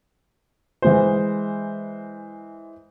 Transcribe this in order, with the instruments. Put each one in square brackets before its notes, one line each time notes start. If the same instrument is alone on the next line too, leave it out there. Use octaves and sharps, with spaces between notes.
[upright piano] E3 G#3 C5